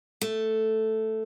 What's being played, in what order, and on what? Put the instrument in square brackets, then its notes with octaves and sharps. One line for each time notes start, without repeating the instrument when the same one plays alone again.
[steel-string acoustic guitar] A3